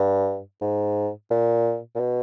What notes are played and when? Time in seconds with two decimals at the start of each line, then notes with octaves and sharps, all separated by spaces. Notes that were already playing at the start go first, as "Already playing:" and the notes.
Already playing: G2
0.61 G#2
1.30 A#2
1.95 A#2
2.00 B2